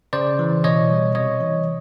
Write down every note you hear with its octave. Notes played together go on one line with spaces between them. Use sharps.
C#3 C5 D5
E3
B2 C#5 D#5
G3
C3 C#5 D#5
E3